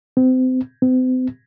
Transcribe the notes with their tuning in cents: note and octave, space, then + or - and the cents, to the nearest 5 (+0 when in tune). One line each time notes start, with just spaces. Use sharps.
C4 -30
C4 -40